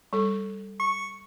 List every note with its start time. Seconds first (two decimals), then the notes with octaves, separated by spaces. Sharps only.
0.13 G3 A4
0.80 C#6